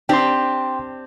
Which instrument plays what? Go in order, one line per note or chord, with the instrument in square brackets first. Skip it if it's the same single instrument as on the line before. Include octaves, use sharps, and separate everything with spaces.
[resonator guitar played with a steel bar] C4 D4 G4 [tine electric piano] G5 C6